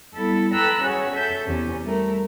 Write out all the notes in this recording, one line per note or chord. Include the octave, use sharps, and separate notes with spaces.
G3 B3 E4 A4
A4 B4 G5 A#5 E6 F#6
C#4 F#4 G#4 C#5
A4 E5 G6
E2 C3 C#4
G3 A3 A#4